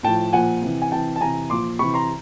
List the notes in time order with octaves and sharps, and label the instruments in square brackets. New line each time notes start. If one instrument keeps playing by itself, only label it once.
[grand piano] A2 F3 G5 A5
A#2 F3 F#5 G#5
C3 E3
G#5
C3 E3 G5 A5
A5
C3 E3 G#5 A#5
A#2 F3 C6 D6
C3 E3 B5 C#6
A#5 C6